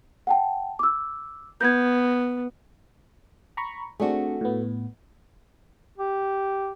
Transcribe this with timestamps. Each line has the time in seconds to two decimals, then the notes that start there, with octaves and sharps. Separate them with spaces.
0.27 F#5 G5 A5
0.79 D6 E6
1.61 B3 G6 G#6
3.57 A#5 B5 C#6
4.00 A3 C4 D4 F#4 G#4
4.41 A2 B3
5.98 G4